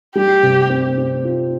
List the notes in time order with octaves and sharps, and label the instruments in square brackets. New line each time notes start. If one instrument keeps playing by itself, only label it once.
[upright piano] G3 [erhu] G4
[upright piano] C3
C4
C4
F4